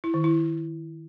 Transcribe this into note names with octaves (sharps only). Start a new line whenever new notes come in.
E4
D#3
E4